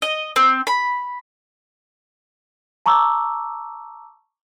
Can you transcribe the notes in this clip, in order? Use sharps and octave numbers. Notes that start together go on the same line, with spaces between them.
D#5
C4
B5
A5 A#5 C#6 D6 E6